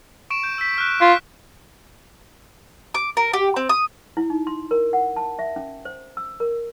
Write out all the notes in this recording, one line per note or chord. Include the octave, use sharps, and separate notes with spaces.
C#6 D7 E7
G6
E6 B6
F6 F#6
F4 B6
D6
A#4
G4
C4
D#6
E4
D#4
C6
A#4
F#5
A5
E5
C#4
C5
E6
A#4